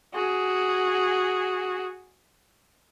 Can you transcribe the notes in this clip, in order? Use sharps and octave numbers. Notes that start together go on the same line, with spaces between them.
F#4 G#4